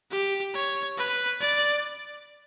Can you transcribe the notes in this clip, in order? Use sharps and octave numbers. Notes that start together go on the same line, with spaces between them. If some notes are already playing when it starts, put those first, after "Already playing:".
G4
C#5
B4
D5